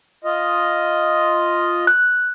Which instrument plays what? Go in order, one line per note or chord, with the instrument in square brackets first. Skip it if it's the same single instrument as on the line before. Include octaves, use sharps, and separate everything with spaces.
[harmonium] F4 D#5
[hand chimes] F#6